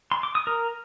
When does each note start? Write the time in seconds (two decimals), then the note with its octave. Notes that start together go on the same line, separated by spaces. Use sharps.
0.12 C6
0.23 D6
0.35 D#6
0.47 A#4